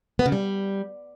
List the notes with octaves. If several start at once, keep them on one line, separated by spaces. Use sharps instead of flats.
B3
C#3
G3